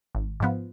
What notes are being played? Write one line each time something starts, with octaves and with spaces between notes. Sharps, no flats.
G#1
G#2 F3 B3